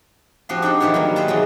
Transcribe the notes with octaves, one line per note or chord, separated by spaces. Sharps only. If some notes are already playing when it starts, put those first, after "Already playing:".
F3 C4 F#4 G4 C5 C6
D4 D#4 D5 F#5 G5
G2 D#3 E3 G4 C5 C#5
F#3 G3 A#3
G#4 B4 C5 G5 A5 A#5
B2 E3 F#3 G#3